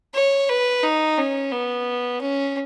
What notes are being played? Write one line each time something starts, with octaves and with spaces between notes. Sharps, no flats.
C#5
B4
D#4
C#4
B3
C#4